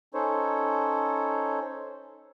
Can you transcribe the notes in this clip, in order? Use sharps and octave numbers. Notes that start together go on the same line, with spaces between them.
C#4 D#4 A4 C5 C#5